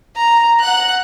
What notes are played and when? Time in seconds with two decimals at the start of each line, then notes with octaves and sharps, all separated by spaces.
0.16 A#5
0.60 F#5 F#6